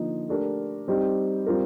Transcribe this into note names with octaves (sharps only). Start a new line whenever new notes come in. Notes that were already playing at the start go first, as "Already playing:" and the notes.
Already playing: D3 F3 A#3 D#4
A3 D4 G4 A#4
G3 C4 D#4 G4
G3 C4 F4 A#4